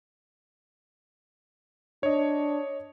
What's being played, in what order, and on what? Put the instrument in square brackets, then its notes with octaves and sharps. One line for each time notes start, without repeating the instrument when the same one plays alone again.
[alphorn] D4 [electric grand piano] C#5 D#5